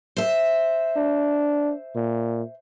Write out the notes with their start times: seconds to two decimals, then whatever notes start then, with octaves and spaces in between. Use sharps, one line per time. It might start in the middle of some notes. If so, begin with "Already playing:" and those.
0.16 C5 E5
0.96 D4
1.96 A#2